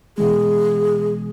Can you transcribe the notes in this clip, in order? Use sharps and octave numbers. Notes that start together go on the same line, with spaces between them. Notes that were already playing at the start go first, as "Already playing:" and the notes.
B2 E3 G#3 G#4